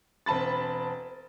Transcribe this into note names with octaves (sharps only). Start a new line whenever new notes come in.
E1 C4 A5 B5 A6